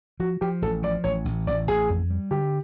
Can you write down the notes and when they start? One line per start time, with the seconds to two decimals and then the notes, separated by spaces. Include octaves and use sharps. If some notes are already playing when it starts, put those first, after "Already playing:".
0.20 F3 F#4
0.41 F3 G4
0.62 A1 A4
0.83 F3 D5
1.04 A1 C#5
1.25 A1
1.47 A1 D5
1.67 A1 G#4
1.89 F2
2.10 G3
2.31 D3 G4